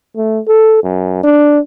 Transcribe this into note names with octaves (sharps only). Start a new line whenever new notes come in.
A3
A4
F#2
D4